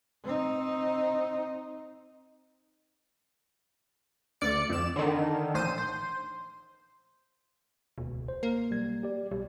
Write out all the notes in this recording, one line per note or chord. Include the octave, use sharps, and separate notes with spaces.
C4 D#4
D2 D5 C#7
F2 E7
D3 D#3
A#1 C5 D#7
C5
D#1 C#2 B2
C5
A#3
B1 G3 G#6
G4 D5
B1 G3 G4